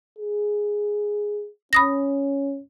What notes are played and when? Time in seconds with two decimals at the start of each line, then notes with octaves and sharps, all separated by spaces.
0.18 G#4
1.73 C#4 B5 D#6 A#6